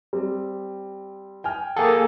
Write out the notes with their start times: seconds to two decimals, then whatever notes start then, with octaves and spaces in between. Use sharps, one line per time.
0.13 G3 C4
1.44 G5 G#5 F6
1.77 A#3 G#4 A4 F#5 G5